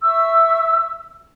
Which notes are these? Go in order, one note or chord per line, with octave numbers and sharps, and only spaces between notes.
E5 C#6 E6